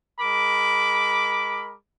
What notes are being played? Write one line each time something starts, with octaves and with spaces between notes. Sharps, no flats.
G#3 A#4 B5 D6